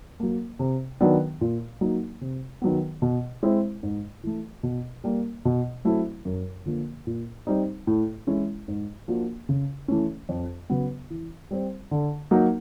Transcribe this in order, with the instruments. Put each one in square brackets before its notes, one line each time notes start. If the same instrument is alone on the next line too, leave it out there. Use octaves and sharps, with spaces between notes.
[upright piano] F#3 A#3
C3
D#3 F#3 B3 D4
A#2
F#3 A#3 D#4
C3
D#3 F#3 B3
B2
G#3 C4 E4
G#2
E3 A3
B2
G3 A#3
B2
F#3 A3 C4 E4
F#2
D3 F3 A#3
A#2
G3 C4 D#4
A2
E3 G#3 C#4 E4
G#2
F3 A#3 D4 F#4
C#3
E3 A3 C#4
F2
C#3 F#3 B3
E3
G3 C4
D3
F#3 A#3 D#4 F#4